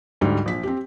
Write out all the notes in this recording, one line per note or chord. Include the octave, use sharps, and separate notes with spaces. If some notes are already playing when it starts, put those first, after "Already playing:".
D2 G#2 G3
A#1 B6
C4 G4